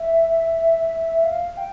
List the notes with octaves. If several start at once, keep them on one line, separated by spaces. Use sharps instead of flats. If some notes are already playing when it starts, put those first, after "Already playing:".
Already playing: E5
F5
G5